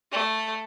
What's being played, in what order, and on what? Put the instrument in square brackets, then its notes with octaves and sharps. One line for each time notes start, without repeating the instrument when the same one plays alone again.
[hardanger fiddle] A3